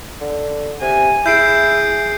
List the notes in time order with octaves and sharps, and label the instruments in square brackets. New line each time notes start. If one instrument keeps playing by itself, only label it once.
[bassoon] D3
[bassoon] C3 [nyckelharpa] G#5
[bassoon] E4 [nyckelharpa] G#4 [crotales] G6 C7 D7